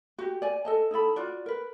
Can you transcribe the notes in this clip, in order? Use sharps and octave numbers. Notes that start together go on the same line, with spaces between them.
F#4 G4
D5 G#5
A4 D#5 A5
D#4 E4 A4 B5
F4 F#4 D5
A#4 B4